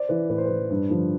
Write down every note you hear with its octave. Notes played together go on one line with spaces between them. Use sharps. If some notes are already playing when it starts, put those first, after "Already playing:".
Already playing: C5 D5
E3 B4
A2 B4
C5
E3 B4
G2
D3 F3